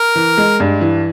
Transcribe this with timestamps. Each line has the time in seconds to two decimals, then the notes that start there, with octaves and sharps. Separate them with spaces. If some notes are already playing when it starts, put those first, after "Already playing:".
Already playing: A#4
0.16 E3
0.37 G#3
0.60 G2
0.81 E3